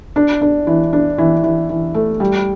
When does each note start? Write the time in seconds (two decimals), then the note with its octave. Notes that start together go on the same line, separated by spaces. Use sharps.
0.16 D4
0.41 D4
0.67 E3
0.93 D4
1.18 E3
1.44 E3
1.70 E3
1.94 A3
2.20 G3